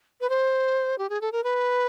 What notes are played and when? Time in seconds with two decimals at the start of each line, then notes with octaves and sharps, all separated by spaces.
0.21 B4
0.29 C5
0.98 G4
1.09 G#4
1.21 A4
1.32 A#4
1.44 B4